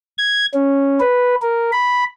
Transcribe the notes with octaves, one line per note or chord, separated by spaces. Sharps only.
G#6
C#4
B4
A#4
B5